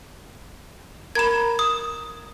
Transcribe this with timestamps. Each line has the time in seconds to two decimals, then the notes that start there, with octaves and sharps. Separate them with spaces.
1.15 A#4 A#5 B5 G#6 E7
1.59 D#6